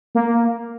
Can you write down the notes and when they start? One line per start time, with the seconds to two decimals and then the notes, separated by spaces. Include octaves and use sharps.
0.15 A#3